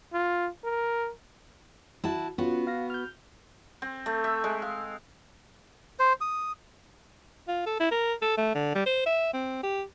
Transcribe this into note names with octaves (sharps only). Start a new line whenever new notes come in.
F4
A#4
E4 F#4 A5
B3 C#4 F4 F#4
F5 A#6
F6 G6
C4
A3
E5
G#3
F5
C5
D#6
F4
A4
E4
A#4
A4
A3
D3
G3
C5
E5
C4
G4